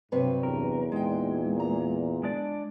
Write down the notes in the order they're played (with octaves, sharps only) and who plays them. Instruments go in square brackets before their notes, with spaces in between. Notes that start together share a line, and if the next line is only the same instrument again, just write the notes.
[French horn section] G2 [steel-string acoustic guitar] C3 F#3 B4
[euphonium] E2 [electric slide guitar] A#4
[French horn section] A#2 [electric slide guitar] G#3 [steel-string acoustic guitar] D#4 G5
[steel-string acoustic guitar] A#5
[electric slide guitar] G#3 D4 D5